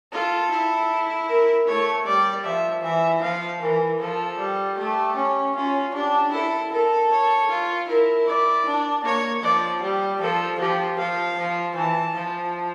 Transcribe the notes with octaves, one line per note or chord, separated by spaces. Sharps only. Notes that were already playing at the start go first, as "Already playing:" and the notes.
F4 A4
E4
A#4
A3 C#5
G3 D5
F3 E5
E3 E5
F3 F5
E3 A#4
F3 A4
G3
A3 G4
C#4
C#4 F4
D4 G4
E4 A4
A4 A#4
C#5
F4
E4 A#4
D5
D4
A#3 C#5
F3 D5
G3
F3 A4
F3 G4
F3 F5
F3
E3 A5
F3